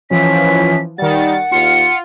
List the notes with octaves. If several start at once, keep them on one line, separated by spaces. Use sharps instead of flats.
E3 F3 C#4 B6
D#3 G3 F#5 A6
D#2 F4 C#7